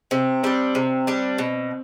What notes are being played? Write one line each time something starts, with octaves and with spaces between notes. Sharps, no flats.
C3 C4
G3 C4 D4
C3 C4
G3 D4
B2